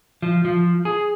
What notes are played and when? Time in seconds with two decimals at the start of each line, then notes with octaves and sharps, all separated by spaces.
0.22 F3
0.45 F3
0.85 G#4